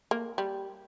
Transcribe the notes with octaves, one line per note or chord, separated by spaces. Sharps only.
A#3
G3